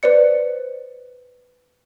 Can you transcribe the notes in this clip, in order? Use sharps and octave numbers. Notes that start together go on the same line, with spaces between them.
B4 C5 D5 C#7